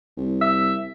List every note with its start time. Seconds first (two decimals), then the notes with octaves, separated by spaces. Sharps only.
0.17 C2
0.42 E5